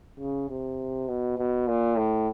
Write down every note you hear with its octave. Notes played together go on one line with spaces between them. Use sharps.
C#3
C3
B2
B2
A#2
A2